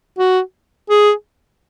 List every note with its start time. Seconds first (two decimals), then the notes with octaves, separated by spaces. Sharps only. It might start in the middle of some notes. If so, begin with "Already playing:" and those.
0.18 F#4
0.90 G#4